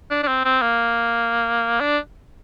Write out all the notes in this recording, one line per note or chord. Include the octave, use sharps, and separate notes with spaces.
D4
D4
C4
C4
A#3
D4